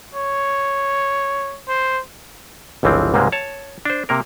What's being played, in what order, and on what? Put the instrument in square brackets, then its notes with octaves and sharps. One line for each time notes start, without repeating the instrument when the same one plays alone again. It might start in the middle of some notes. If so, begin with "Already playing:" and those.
[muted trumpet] C#5
C5
[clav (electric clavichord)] G1 C#2 E3 F3 C4
C#2 G#2 C3 G3 G#3 A#3
C#5 A5
D4 C5
C3 A#3 A#4